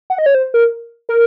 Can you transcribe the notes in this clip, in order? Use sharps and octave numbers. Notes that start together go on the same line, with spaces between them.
F#5
D#5
C#5
C5
A#4
A#4